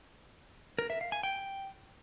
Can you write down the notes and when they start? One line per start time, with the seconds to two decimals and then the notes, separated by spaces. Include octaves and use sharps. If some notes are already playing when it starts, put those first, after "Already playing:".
0.79 A#4
0.90 E5
1.01 F5
1.12 G#5
1.23 G5